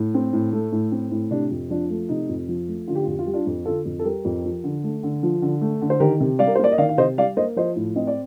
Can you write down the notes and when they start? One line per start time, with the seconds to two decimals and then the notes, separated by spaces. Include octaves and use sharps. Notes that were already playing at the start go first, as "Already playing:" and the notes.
Already playing: A2
0.14 C4
0.33 A2
0.52 A3
0.72 A2
0.92 C4
1.11 A2
1.31 C3 D4
1.51 F2
1.70 F3 D4
1.90 A3
2.09 C3 D#4
2.29 F2
2.48 F3
2.68 A3
2.87 D3 F4
2.95 G4
3.03 F4
3.07 F2 G4
3.19 F4
3.26 G3 G4
3.33 D4 F4
3.46 F2
3.65 D3 F4 A4
3.85 F2
3.99 A4
4.04 G3 G4 A#4
4.25 F2
4.45 F3
4.64 D3
4.84 A3
5.03 D3
5.23 F3
5.42 D3
5.61 A3
5.82 D3
5.90 C5
6.00 D#3 G4 A#4
6.20 C3
6.39 G3 D5 F5
6.47 A#4
6.55 C5
6.59 A#3 D5
6.72 D#5
6.78 D#3 D5 F5
6.89 F5
6.98 C3 C5 D#5
7.18 G3 D5 F5
7.37 A#3 C5 D#5
7.56 F3 C5 D#5
7.76 A2
7.96 C4 D#5
8.07 D5